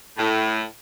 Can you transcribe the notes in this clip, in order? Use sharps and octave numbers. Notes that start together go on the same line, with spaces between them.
A2